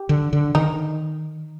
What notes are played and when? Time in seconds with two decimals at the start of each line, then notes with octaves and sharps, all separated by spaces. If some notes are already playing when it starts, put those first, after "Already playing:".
Already playing: G4
0.09 D3
0.33 D3
0.55 D#3 D#4